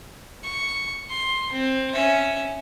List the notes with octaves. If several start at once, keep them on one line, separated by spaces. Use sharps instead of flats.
C#6
C6
C4
C#4 E5